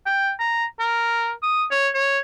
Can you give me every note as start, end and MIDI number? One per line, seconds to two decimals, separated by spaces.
0.06 0.31 79
0.40 0.65 82
0.79 1.31 70
1.43 1.65 87
1.71 1.89 73
1.95 2.19 73